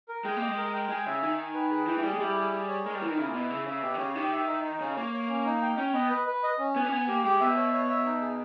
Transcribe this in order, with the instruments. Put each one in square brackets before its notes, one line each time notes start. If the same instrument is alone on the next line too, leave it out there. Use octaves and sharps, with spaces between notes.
[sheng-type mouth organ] A#4
[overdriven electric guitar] G#3 [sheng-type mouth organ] G5
[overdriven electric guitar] A#3 [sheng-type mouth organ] D#5
[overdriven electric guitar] G#3
[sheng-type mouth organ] A#4
G5
[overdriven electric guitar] G#3 [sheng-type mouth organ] G#5
[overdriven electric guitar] C#3 [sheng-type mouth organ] E5
[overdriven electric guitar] D#3 [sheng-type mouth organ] G#5
[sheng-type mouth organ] G#5
B4
G#4
[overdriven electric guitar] E3 [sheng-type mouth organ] G5
[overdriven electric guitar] E3
[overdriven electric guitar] G3 [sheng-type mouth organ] G#4
[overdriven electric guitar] G#3
[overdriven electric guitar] G3 [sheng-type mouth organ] E4
[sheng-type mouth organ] G#4
G#4
C#5
[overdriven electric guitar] G#3 [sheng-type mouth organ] A#4
[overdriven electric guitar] G3
[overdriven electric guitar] E3 [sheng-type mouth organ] A#4
[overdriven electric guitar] D#3
[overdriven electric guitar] C#3 [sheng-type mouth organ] E4
[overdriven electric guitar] A#2
[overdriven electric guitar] B2 [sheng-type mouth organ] E4
[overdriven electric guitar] C#3 [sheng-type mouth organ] E5
[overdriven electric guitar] C#3 [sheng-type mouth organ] E5
[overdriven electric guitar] B2 [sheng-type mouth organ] G4
[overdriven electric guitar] D#3
[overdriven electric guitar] C#3 [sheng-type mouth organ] C#5
[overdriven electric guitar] D#3 [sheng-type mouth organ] G4
[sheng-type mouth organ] E5
D#4
D#4
[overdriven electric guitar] C#3 [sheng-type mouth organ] C#4
[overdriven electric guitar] A#3 [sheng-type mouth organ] C#5
[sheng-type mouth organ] C#5
C#4
D#4
G5
[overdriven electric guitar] C#4 [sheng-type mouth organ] G5
[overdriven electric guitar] B3 [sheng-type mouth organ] D#5
[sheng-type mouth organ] B4
B4
D#5
C#4
[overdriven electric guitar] B3 [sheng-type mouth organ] G#5
[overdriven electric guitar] C#4
[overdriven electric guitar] B3 [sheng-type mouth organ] G#5
[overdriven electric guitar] A#3 [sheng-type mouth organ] G4
[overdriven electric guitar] G#3 [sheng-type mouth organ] G4
[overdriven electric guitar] B2 [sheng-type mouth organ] E5
[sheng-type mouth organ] C#5
C#5
E5
D#4
G#4